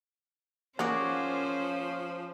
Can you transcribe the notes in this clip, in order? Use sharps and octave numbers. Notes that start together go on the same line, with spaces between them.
F3 A#3 C#4 F#4 G#4 C5 D5